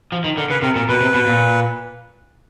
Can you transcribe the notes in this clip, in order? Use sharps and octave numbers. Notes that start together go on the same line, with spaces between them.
F3
D#3
D3 A#4
C#3 B4
C3 A#4
A#2 A#4
B2 B4
C3
B2
A#2